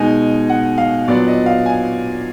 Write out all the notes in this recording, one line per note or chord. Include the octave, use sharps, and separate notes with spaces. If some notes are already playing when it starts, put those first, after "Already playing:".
Already playing: B2 G#3 D#4 G#5
F#5
F5
A#2 F#3 B3 D4 D5
D#5
F5
G#5